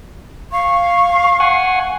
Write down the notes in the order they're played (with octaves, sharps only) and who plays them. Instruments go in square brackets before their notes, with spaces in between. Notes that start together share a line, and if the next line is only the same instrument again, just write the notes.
[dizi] F5 [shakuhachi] C#6
[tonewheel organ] F#5 G#5